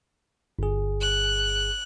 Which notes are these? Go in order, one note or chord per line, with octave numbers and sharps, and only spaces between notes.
G1 G#4
F#6